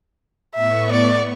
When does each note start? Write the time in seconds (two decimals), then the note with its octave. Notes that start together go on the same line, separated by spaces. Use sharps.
0.55 A2 B3 E5 C#6
0.92 D5